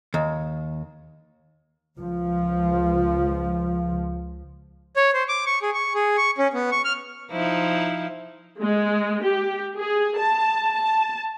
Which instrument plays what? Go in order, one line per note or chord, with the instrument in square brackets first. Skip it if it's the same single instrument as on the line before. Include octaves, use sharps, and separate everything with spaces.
[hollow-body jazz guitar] D#2
[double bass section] C#2 F3
[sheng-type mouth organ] C#5
C5
D6
C#6
G#4
C#6
G#4
C#6
C#4
B3
C#6
F6
[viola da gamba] F3 D#4 E4
[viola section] G#3
G4
G#4
A5
A5